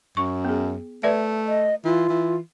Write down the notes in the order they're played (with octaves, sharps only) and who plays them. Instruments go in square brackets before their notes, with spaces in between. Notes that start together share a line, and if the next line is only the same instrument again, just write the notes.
[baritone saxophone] F#2 [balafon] C#6
[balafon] B3 G#4
[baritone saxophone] A3 [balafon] B4 D5 E5
[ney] D#5
[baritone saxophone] E3 [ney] F4
[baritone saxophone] E3